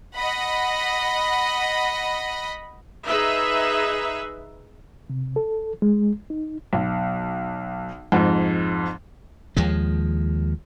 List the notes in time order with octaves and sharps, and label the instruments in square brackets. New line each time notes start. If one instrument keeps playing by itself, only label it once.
[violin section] D#5 F#5 B5
[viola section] D#4 G#4 B4 E5
[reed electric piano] C3
A4
G#3
D#4
[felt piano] B1
F2 G#2
[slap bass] D#2 F3 G#3